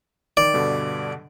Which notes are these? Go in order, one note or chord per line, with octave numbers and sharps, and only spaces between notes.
D#3 D5
G2 B2 D3